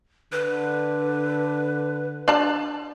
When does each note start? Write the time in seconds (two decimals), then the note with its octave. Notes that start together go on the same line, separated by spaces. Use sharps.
0.32 D3 B4
2.28 D4 D5 A5